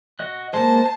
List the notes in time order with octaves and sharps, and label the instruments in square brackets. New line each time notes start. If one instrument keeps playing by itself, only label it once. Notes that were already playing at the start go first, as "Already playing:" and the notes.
[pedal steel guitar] F#4 D#5 F#6
[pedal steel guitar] G#3 A#3 [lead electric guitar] C5 [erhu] A5